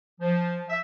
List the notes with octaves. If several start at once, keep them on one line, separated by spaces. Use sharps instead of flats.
F3
E5